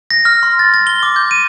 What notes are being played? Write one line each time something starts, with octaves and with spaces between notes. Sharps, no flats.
A#6
F6
C6
A6
A6
G7
D6
G6
D#7